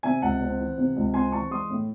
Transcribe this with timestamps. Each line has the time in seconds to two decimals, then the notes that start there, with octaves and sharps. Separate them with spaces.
0.03 C3 E5 G#5
0.22 C#2 F#5 A5
0.41 C4
0.59 E3
0.78 C3
0.96 C#2
1.14 C4 G#5 C6
1.32 E3 A5 C#6
1.50 G#3 C6 D#6
1.70 A2